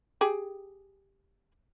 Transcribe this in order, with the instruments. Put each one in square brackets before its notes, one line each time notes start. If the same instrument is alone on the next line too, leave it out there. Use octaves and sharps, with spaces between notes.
[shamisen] G4 G#4 G5